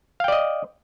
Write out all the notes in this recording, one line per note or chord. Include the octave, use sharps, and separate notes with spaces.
D5 D#5 F5 G5